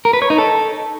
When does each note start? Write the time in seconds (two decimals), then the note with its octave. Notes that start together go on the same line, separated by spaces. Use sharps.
0.05 A#4
0.13 B4
0.22 C#5
0.30 D#4
0.38 A4